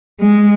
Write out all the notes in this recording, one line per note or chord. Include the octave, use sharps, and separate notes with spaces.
G#3